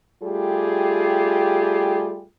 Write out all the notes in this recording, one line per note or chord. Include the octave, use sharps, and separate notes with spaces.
G3 A3 F4 G4 G#4